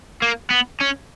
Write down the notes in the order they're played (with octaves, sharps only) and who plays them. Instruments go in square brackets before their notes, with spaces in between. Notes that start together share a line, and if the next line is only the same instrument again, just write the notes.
[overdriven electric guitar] A#3
B3
C#4